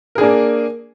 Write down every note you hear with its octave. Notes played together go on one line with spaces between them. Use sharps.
A#3 D4 G#4 A#4